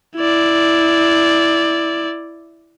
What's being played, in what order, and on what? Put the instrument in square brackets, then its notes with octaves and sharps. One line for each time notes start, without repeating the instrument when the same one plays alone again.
[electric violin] E4 D5